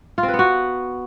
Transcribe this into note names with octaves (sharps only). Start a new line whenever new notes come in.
F4
C4
B4
B3
F#4